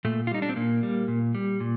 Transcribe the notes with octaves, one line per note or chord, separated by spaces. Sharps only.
A#2 A3
F4
G3 D#4
D4
C4
A#2 A#3
G3
A#2
G3
A#2